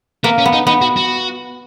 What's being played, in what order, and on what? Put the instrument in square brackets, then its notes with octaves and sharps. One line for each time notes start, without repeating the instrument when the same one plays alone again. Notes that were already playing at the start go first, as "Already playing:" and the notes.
[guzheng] A#3 [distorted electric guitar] B3
[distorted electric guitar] C#4
[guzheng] B3
[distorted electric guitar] D#4
[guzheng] B3 [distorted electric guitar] D#4
[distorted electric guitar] F#4
F#4